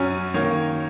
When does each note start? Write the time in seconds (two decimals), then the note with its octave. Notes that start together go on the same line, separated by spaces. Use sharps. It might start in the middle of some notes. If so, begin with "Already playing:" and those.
Already playing: F#2 F#3 C#4 G#5
0.34 D#3 A#3 C#5